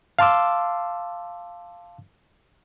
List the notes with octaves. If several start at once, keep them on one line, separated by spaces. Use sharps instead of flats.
F5 A5 C6 D6 E6